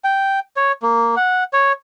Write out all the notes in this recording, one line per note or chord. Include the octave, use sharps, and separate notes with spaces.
G5
C#5
A#3
F#5
C#5